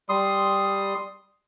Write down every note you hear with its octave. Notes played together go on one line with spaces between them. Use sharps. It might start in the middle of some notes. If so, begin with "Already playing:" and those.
G3 C6 D#6